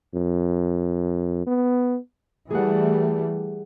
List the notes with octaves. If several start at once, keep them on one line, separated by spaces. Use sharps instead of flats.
F2
B3
E3 G3 A3 G#4 F#5